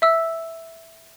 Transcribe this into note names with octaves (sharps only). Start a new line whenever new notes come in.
E5 E6